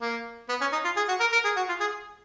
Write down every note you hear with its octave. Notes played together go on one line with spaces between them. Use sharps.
A#3
B3
C#4
D#4
F4
G#4
F#4
A#4
A#4
G#4
F#4
F4
G#4